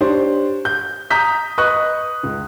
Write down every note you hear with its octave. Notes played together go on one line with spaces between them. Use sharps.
D4 G4 C5 C#5 C6
G6
A#5 D#6 G6 B6
B4 D#5 C#6 D#6 F#6
C#2